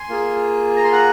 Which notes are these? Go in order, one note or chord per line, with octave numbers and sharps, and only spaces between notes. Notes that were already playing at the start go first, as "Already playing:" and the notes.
Already playing: G#5 C6
A#3 F4 G#4
A#5
C6
F#5 A#5